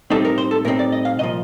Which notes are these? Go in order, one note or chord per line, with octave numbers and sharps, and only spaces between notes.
A2 G3 C4 D#4 A4
A#4
C5
A4
A2 G3 C4 D#4 A#4
D5
D#5
F5
C2 A#2 F3 D#5